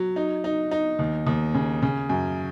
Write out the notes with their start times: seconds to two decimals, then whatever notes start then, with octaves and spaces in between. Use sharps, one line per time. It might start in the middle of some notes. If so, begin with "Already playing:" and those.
Already playing: F#3
0.16 D#4
0.44 D#4
0.71 D#4
0.99 D#2
1.27 D#2
1.54 C#3
1.82 C#3
2.09 F#2